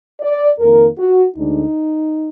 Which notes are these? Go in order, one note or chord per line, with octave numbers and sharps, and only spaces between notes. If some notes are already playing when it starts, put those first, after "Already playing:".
D5
F2 D#3 A#3 A#4
F#4
D2 D3 G#3 D4 D#4